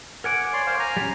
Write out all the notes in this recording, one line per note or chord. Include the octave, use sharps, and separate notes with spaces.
A#4 F#5 G#5 D6
C#5 D5 C6
C5 F5
G#5 A#5
G3 C#4